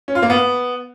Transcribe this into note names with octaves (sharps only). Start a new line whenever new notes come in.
C#4
F4
A#3
B3